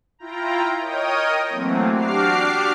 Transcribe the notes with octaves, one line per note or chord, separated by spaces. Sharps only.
E4 F4 G5 A#5
A#4 C#5 D#5 G5 D#6
E3 F#3 A3 A#3 C4
D4 F#4 G4 D6 F6 C7